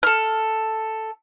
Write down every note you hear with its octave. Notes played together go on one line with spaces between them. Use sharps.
A4 F6